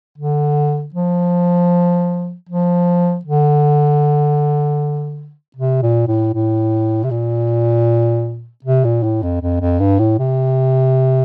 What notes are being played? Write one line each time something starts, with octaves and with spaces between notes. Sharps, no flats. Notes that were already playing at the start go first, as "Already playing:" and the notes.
D3
F3
F3
D3
C3
A#2
A2
A2
C3
A#2
C3
A#2
A2
F2
F2
F2
G2
A2
C3